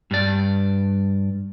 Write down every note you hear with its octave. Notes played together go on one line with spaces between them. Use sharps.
G2 D5